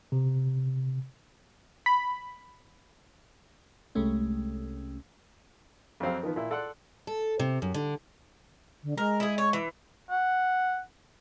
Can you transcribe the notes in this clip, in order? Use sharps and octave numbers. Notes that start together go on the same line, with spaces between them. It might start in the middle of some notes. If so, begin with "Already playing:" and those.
C3
B5
C2 C3 G#3 A3 C#4
F2 F#3 C4 F5
D#3 F3 B3
A#2 E4
A4 D5 F#5 C6 F#6
A4
C3
F#2
D3
D3
G#3 A#4
E4 G#4
C#5
E3
F#5